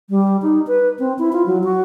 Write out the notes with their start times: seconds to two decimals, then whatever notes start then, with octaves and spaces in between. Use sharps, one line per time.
0.10 G3
0.42 D#4
0.67 B4
0.99 C4
1.19 E4
1.33 F4
1.46 F#3
1.64 F#4